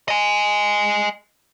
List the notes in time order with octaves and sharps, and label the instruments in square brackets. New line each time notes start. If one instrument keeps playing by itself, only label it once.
[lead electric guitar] D#5 G#5